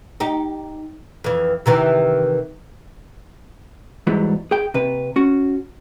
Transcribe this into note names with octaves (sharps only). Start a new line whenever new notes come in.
D#4 G4
F2 E3
C3 D#3 E3
E2 G#2 F#3 G3 E4
G#4 G5
C3 B4
C#4 F#4